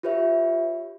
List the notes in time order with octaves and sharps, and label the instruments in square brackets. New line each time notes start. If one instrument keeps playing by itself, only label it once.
[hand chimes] F4 G4 B4 C#5 E5